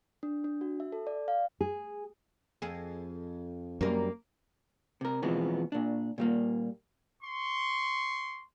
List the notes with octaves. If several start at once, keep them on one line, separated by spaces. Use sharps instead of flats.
D4
D4
F#4
E5
A4
D5
F5
G#4
F2 G#4
F#2 G3 A#3 A#4
C3 A#4
B2 E3 F3 G#3 B3 C4
A#2 D4
A#2 G3 A#3
C6 C#6